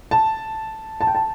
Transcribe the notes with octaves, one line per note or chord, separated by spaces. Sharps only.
A5
A5
G5
A5